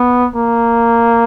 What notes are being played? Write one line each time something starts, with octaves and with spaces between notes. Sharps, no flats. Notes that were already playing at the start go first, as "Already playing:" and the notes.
Already playing: B3
A#3